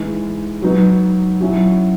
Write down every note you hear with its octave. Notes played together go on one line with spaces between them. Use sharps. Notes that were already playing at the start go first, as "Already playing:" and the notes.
Already playing: E3 G#3 D#4
F#3 B3 D#4
F#3 C#4 E4